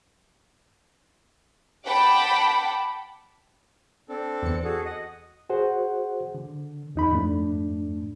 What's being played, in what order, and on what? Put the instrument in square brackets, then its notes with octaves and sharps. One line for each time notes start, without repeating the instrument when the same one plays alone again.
[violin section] F#5 G5 A5 B5 D6
[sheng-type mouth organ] C4 D4 A4
[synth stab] E2 C#7
[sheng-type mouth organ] F#4 G#4 A4
D#5 F#5
[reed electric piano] F#4 G#4 C5 F#5
D3
E2 D#4 B5
F2 G#2 A3 D4